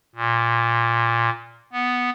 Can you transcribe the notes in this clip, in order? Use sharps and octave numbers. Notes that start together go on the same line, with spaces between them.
A#2
B3